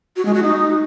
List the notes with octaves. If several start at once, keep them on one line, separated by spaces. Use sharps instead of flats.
F#4
G#3
F#4
D#4